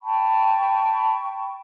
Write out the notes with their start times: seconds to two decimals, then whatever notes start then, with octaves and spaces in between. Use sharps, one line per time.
0.03 G5 A5 B5 C#6